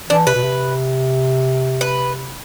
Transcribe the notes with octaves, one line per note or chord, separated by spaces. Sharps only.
E3 D4
C3 B4
B2
C3
B4